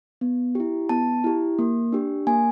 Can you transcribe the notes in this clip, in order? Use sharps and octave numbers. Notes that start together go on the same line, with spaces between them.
B3
E4 G4
B3 A5
E4 G4
A#3
D4 G4
A#3 G#5